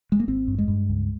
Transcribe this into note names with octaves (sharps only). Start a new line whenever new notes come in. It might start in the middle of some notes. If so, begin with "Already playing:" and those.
G#3
A#3
G#1 C4
G2
G#3
G2
C#2